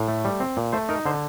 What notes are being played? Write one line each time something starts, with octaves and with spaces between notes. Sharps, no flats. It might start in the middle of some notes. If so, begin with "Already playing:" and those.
Already playing: A2
A3
G3
C4
A#2
A3 C5
D#4 A#4
D3 C5